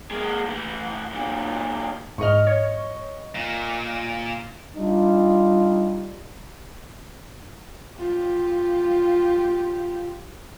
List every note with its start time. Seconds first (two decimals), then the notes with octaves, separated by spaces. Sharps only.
0.11 G#3 A#3
0.48 A2 E3
1.13 F#2 A#2
2.18 G#2 D#5 C#6 F6
2.47 C#5
3.35 A#2
4.77 G3 D4 D#4 F4
7.99 F4 G4